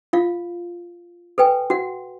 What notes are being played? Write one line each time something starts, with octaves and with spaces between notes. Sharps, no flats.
F4 F5
A4 B4 G5 G#5
F#4 F#5